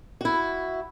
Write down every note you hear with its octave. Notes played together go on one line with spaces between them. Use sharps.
E4 F#4